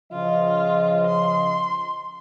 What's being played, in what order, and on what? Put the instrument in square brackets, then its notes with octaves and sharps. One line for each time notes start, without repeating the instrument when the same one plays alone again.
[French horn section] C#3 F3 D#5 [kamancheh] F4
[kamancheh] C6